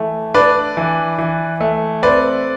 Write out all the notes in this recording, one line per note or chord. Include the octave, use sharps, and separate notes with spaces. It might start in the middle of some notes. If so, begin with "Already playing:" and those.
Already playing: E3 A3
D4 B4 D5
E3
E3
A3
C4 B4 D5